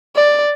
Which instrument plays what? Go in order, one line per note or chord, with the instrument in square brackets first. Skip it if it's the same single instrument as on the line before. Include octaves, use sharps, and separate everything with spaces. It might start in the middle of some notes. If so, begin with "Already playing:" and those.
[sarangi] D5